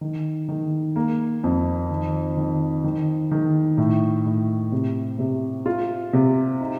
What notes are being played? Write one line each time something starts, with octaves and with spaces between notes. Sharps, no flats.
D#3
D#3
A#3
F2
D#3
D#3
D#3
D#3
A2
A2
C3
C3
F4
C3
D#4